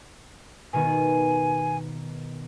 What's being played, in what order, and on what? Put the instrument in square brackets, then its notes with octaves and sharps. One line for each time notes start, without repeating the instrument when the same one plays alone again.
[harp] B2 D#3 B3 [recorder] G#5